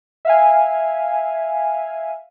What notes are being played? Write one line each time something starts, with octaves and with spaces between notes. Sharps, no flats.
E5 F5 G#5